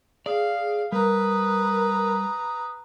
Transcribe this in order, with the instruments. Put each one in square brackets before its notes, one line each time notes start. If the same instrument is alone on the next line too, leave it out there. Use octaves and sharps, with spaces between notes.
[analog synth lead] G#4 [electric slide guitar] D5 [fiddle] F5
[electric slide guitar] G3 [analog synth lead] A#4 [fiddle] B4 A#5 [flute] D#6